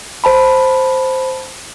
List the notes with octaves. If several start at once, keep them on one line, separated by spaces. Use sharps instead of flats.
C5 A5 B5